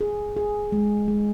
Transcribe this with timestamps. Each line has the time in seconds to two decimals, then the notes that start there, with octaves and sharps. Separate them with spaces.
0.01 G#4
0.37 G#4
0.72 G#3
1.08 G#3